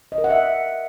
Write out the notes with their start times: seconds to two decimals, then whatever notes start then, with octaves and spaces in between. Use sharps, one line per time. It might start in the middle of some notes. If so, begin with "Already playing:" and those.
0.12 D#5
0.18 A#4
0.24 F#5
0.30 E5